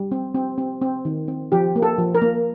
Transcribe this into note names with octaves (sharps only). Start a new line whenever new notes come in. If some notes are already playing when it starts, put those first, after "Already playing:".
Already playing: G3
C4
C4
C4
C4
D#3
C4
F3 G4
A#3
A4
F3
A#4
A#3